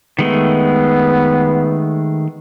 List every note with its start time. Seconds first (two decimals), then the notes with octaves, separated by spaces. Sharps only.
0.19 D#3 G#3 A3 B3